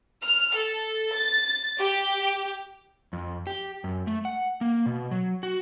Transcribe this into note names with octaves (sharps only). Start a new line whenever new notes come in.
F6
A4
A6
G4
F2
G4
F#2
A3
F#5
A#3
B2
F#3
F#4